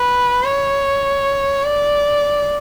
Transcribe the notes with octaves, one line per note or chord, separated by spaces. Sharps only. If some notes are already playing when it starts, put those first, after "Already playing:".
Already playing: B4
C#5
D5